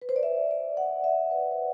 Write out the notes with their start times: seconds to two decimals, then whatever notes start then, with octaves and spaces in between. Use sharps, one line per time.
0.02 B4
0.09 C5
0.16 D5
0.23 E5
0.51 D5
0.77 F#5
1.04 E5
1.31 B4
1.52 C5